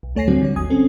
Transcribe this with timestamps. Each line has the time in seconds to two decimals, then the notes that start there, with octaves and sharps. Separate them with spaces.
0.03 B1
0.16 D2 A3 C#5 G#5 A#6 C7
0.28 A2 D3 F#3 G3 C4 F#4
0.41 D3 G3 C#5
0.56 G#1 D#2 G#5 D#6 G#6
0.70 C4 C#4 A4